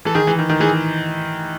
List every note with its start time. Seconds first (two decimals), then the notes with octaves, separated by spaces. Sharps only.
0.05 E3 A4
0.15 D#3 G#4
0.27 E3
0.39 D#3
0.49 D#3
0.61 E3 G#4